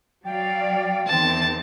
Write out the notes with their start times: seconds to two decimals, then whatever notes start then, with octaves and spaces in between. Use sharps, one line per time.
0.25 F#3 D5 F5 G5
1.07 E2 D#3 C4 A5